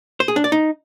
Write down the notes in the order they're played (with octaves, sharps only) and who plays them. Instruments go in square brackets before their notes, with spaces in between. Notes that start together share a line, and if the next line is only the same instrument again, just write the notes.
[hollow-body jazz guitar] C5
G#4
D4
D5
D#4